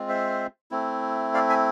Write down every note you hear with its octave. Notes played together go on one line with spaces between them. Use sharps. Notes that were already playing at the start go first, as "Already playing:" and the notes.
Already playing: G#3 C4 F4
C5 E5
A3 C4 E4
D5 F5
E5 G#5